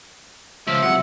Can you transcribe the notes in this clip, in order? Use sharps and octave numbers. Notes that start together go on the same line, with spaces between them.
C#2 F3 E5
C3 F#3 F#5